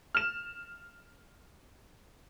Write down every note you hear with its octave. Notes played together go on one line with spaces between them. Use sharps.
F6 E7